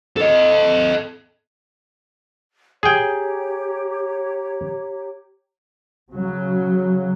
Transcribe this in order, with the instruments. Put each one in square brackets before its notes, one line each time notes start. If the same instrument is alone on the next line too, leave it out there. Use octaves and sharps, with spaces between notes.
[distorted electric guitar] A4 D#5
[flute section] G4 C#5 A#5 [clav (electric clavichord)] G#4 G5
[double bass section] C#3 F#3